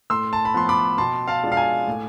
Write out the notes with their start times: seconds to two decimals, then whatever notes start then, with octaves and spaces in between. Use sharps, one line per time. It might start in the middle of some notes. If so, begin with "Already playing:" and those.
0.10 A2 C6 E6
0.33 A5
0.45 B5
0.54 F3 B3 F4 C6
0.69 B5 D6
0.98 B2 A5 C6
1.28 F5 A5
1.43 G#3 D4 F4
1.52 F5
1.57 G#5
1.87 A2